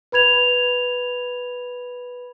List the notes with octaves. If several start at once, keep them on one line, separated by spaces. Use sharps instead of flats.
B4 B5 G#6 F7